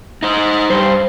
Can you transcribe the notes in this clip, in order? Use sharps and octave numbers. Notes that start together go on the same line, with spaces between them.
D#4 C5
G2 C5